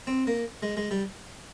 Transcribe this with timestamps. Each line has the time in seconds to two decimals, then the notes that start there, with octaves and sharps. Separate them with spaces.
0.07 C4
0.27 A#3
0.62 G#3
0.77 G#3
0.91 G3